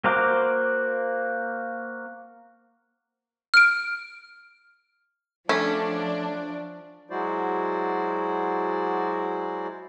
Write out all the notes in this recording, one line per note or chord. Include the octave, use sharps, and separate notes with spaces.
A#3 F#4 C5 A#5 D6
F6 D7
D3 F3 A3 C#4 D4
F#3 G#3 E4 F#4 C5 D5